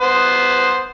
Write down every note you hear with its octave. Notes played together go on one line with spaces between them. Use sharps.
B3 C5